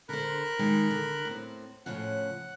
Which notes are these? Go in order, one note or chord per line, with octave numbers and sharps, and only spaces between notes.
D3 A#4 C5 B5 F#6
D#3 G#3 D#4
D3
A2 C4
A2 C#3 F3 F#5 F#6